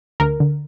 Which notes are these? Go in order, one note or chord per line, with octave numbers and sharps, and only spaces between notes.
D2 A#4
D3